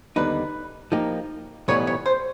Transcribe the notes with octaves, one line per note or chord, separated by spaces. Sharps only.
D#2 D3 G3 B3 D#4 B4
F3 A#3 D#4 G4
B1 A2 E3 G3 B3 C#5
C#5
C5